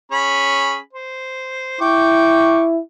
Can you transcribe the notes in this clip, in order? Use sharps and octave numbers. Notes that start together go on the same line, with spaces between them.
C#4 G#4 B5
C5
E4 G5 C#6 D6